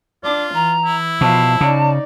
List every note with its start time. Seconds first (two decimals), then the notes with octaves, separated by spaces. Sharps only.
0.24 D4 F4 D6
0.54 E3 A#5
0.85 E4
1.21 B2 F3 F5 A5
1.61 C#3 D#4 D5